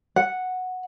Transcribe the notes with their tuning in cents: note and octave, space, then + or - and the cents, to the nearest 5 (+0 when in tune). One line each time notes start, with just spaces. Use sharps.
F#5 -5